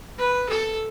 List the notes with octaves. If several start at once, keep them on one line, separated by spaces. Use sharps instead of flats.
B4
A4